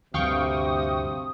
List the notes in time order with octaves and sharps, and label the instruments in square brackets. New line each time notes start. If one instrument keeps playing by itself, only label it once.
[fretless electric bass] D2 G2 [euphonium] C3 [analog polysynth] F5 G5 C#6 [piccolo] D#6